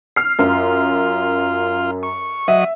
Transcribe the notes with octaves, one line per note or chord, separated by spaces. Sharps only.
F6 C7
F#2 F4
C#6
F#3 D#5 E5